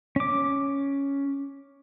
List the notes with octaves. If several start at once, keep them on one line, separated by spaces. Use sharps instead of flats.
C#4 D6